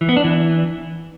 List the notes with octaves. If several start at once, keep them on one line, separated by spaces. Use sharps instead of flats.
E3
B3
D4
E3